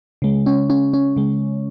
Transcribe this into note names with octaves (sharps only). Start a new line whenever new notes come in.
C#3 G#3
C#4
C#4
C#4
C#3 G#3